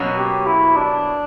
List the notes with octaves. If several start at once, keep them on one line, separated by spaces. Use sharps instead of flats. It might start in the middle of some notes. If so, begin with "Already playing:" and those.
Already playing: B2 F#3 A#3 C#4 F#4
G4
E4
D4